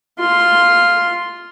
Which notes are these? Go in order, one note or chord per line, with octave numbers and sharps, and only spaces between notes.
F4 C6